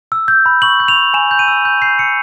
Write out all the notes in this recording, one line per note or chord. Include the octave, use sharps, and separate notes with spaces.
E6
G6
B5
C#6 F#7
G6
F7
C#6
G#5 E7
G6
D#7
E6
G6
G6 C7
E6 C#7